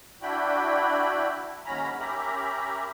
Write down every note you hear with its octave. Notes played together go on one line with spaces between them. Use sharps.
D4 E4 F#4 G5 B5
D#2 G#2 F#3 C#4 A#5 B5
C#4 G4 A#4 E5 A#5 B5